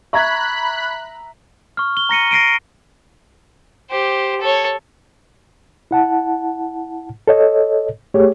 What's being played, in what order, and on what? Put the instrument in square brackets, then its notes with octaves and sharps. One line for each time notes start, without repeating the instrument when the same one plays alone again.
[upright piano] E5 A#5 [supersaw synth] B5 F#6 [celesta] C#6 G#6
[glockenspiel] C#6 F6
G7
A#5 A#6 C#7 D#7
A#6 C7 D7 D#7
[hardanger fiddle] G4 C5
A4 C#5
[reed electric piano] E4 F#5 A5
A4 C#5 D#5
A3 G4 G#4 C#5